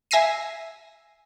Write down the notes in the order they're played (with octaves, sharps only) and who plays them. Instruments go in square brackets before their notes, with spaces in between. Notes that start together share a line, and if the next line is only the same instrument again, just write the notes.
[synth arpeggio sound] E5 G#5 E6 A#6 C7 D#7